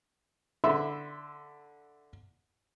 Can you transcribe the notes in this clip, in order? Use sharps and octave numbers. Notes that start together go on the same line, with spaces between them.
D3 E5 B5 C6